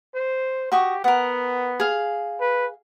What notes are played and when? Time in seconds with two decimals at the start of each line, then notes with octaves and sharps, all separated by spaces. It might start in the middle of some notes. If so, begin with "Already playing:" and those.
0.15 C5
0.72 F#4 G4 C#6 D#6
1.04 B3 A#4 F#5
1.80 G#4 F5
2.40 B4